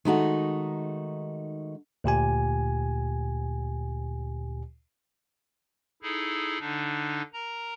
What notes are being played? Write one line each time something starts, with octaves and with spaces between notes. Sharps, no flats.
D#3 G#3 A3 D#4 F#4
D2 A#2 G4 G#5
D#4 E4 G#4 A4
D3 D4 D#4
A#4 A#5